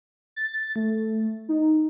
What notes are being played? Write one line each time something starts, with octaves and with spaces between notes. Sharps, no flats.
A6
A3
D#4